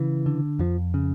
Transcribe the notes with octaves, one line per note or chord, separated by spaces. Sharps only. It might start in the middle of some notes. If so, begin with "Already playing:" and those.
Already playing: C#3 E3
D3
F2 F3
C#3